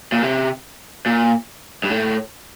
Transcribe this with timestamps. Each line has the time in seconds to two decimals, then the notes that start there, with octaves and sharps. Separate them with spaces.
0.12 A#2
0.22 C3
1.06 A#2
1.84 G2
1.90 A2